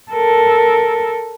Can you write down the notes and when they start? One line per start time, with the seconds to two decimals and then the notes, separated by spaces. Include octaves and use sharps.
0.12 A4 A#4